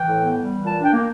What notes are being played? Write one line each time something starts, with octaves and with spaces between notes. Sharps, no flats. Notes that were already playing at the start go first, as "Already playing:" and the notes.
Already playing: E3 G5
A2
B3
G3
E3
A#2 A5
D4 G5
A#3